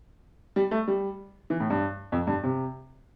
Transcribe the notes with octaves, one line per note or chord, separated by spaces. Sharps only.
G3
A3
G3
E3
A2
G2
F2
G2
C3